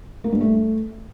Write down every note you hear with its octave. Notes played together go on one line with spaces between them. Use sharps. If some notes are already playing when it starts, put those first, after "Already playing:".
A#3
G2
A3